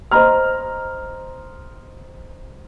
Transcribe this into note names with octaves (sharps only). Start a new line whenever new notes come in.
C5 D#5 A#5 F6